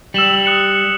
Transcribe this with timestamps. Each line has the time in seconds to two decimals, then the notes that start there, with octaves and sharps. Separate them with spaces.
0.14 G3 E6 E7 F#7
0.46 D#6 F#6 C#7